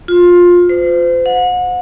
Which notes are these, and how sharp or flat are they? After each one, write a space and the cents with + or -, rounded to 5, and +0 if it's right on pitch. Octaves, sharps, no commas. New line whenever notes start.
F4 +15
C5 -35
F#5 -35